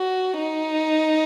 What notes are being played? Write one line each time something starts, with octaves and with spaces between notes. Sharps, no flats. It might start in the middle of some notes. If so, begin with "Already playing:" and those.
Already playing: F#4
D#4